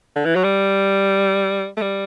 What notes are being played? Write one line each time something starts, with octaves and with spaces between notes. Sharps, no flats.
D3
E3
F#3
G3
A3
G3